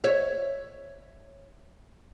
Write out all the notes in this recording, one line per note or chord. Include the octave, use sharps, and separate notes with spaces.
C#5 E5